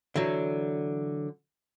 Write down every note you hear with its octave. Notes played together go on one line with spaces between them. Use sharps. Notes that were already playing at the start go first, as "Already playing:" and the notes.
D3 E3 F#3